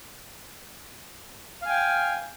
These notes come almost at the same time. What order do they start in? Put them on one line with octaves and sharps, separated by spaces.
F5 G#5 G5